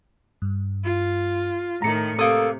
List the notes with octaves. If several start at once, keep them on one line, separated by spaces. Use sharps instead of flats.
G2
F4
A2 D#3 A#5 C#7
C3 A#3 A4 D#6